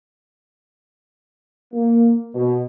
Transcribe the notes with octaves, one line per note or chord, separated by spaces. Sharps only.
A#3
B2